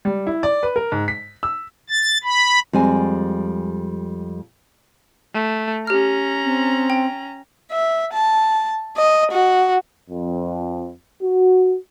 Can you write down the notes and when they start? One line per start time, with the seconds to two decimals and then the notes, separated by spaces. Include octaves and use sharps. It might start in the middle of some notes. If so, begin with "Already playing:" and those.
0.05 G3
0.27 E4
0.43 D5
0.63 B4
0.76 A#4
0.92 G#2
1.08 B6
1.43 E6
1.89 A6
2.24 B5
2.73 F2 G3 G#3 G#5
5.34 A3
5.87 C#4 G4 A#5 F6
6.45 C4
6.90 G5
7.72 E5
8.13 A5
8.97 D#5
9.32 F#4
10.09 F2
11.23 F#4